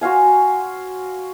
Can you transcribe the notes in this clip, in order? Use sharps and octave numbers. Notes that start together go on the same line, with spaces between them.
F#4 C5 F5 G#5